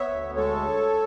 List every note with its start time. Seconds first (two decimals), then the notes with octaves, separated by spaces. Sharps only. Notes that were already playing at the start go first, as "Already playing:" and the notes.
Already playing: B3 C#5 E5
0.08 D2
0.36 G#3 A4 C#5